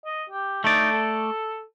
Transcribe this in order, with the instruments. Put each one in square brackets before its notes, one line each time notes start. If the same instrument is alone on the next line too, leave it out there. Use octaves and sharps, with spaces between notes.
[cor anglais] D#5
G4
[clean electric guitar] A3 D5 [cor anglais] D#4
[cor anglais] A4